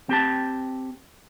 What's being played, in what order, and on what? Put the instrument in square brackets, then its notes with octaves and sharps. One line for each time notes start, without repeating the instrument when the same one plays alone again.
[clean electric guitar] C4 G4 A5